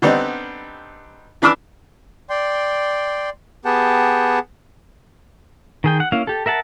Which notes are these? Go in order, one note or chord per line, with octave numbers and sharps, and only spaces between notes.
D3 G3 B3 C4 D#4
E3 D4 B5 D6 E6
D5 G5 C6
B3 G4 G#4 F#5 G5 A5
D#3 G#4 G5
F#5
A#3 C#4 E4 F5
G4 A4
A#4 E5 F#5 A5